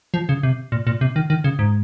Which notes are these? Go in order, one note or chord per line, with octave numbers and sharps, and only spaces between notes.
F3
C#3
C3
A#2
A#2
C3
D#3
D#3
C#3
G#2